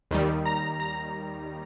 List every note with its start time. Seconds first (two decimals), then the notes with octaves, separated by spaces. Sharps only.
0.11 D#2 D#3 G3
0.46 A#5
0.80 A#5